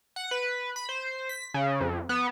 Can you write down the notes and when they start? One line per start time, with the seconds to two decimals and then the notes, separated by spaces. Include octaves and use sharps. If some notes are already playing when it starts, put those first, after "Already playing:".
0.16 F#5
0.31 B4
0.76 B5
0.89 C5
1.29 B6
1.54 C#3
1.81 F2
2.09 B3